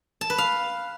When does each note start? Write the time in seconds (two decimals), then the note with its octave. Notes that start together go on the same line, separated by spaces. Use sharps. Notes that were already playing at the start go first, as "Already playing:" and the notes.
0.21 A5
0.30 B4
0.38 F5